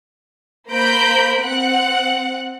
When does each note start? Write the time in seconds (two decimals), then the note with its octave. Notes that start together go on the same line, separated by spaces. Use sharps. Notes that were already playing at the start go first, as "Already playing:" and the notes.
0.72 A#3 C5 A#5 B5 G6 D7
1.43 C4 F#5 F#6